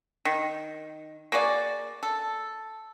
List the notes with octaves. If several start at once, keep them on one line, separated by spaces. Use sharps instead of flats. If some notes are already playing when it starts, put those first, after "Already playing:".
D#3
A#3 F#4 G#4 D5
A4